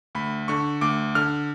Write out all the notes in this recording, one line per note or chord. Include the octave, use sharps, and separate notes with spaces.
D2 B5
D3 C#6
D2 D6
D3 F6